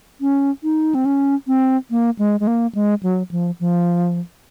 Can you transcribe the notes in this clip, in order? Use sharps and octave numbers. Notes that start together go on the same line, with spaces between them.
C#4
D#4
C4
C#4
C4
A#3
G#3
G#3
A#3
G#3
F#3
F3
F3